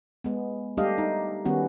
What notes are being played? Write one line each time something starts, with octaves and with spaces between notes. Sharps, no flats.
G#3 B3
G3 A3 D4 G4 D#5 F5
D#4
D#3 G3 B3 C#4 F#4